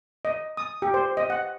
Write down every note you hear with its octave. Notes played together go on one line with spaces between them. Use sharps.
D#5
D#6
G4
C5
D#5
F#5